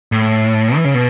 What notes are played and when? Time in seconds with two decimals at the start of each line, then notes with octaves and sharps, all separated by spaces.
0.12 A2
0.76 E3
0.85 C#3
0.94 B2